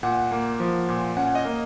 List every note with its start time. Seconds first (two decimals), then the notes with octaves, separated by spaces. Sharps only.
0.03 A#2 F#5
0.32 A#3
0.60 F3
0.89 A#2
1.17 C#4 F#5
1.35 D#5
1.45 A#3